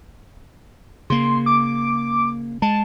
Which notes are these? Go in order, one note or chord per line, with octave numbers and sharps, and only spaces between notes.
C#3 A#3 C6
D6
G#3 A5